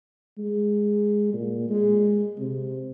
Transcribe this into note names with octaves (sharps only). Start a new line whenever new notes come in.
G#3
A#2
G#3
C3